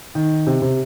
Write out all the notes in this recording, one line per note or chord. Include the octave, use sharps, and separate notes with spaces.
D#3
C3
C3